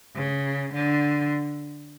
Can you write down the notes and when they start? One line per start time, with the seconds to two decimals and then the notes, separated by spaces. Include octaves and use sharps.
0.16 C#3
0.74 D3